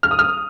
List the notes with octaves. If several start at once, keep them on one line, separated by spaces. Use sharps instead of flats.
F6
D#6
F6